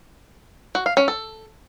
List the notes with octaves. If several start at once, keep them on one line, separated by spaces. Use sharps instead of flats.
F#4
F5
C#4
A4